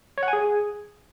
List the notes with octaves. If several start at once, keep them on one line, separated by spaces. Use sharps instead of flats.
C#5
F#5
G#5
G#4